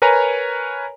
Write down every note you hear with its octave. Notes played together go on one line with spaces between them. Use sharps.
A#4 B4 C#5 G#5 A#5